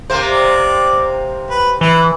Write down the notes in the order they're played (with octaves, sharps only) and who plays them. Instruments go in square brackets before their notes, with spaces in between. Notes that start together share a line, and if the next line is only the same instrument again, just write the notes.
[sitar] C3 A#3 C5
[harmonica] D5
B4
[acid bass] E3 [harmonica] E4